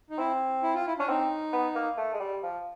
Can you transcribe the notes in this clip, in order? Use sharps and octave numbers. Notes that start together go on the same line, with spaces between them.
D#4
C4 E4
E4
F4
E4
C#4 D4
C4 D#4
B3
A#3
A3
G#3
G3
F3